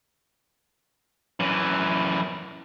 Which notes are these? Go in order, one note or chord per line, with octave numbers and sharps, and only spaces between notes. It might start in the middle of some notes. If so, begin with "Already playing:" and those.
F#2 E3